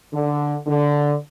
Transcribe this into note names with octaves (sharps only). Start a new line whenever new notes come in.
D3
D3